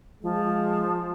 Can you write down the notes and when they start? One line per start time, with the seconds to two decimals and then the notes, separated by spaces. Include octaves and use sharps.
0.23 F3 G#3